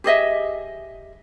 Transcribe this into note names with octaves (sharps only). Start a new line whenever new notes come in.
G4 G#4 D#5 E5